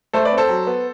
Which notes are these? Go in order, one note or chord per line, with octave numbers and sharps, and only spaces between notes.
A3 A4 C5
B4 D5
C4
A4 C5
F#3
B3